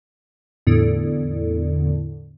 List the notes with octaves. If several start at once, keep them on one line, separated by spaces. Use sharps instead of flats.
E2 A2 D3